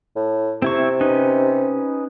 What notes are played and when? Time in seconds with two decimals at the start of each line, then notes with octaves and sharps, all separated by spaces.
0.16 A2
0.62 C3 C4 E4 C#6
1.01 C#4 D#4 B4